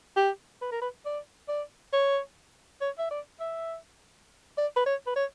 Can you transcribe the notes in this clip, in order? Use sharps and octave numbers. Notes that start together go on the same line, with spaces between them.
G4
B4
A#4
B4
D5
D5
C#5
C#5
E5
D5
E5
D5
B4
C#5
B4
C#5